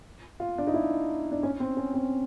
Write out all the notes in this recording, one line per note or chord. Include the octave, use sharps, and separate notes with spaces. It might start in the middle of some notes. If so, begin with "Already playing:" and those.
F4
D4
D#4
E4
D4
C#4
C4
C#4
C4